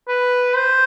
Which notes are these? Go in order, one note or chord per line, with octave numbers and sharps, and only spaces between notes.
B4
C5